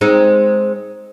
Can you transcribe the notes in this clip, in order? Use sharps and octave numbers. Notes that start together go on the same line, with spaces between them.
G#3 C4 D#4